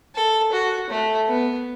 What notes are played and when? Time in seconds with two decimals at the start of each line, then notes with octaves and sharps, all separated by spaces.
0.15 A4
0.52 F#4
0.90 A3
1.28 B3